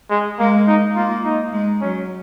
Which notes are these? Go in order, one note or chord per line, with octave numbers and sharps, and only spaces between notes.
G#3
G#3 A#3
D#4
A#3 F4
D#4
G#3
F#3 C#4